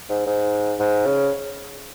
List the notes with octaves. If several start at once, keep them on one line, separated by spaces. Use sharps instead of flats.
G#2
G#2
G#2
C#3